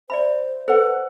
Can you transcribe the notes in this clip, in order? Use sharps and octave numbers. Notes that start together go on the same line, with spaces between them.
C5 D5 E5 B5
A4 B4 C5 F#5